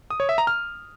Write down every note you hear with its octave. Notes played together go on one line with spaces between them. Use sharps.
D#6
C#5
E5
A#5
F6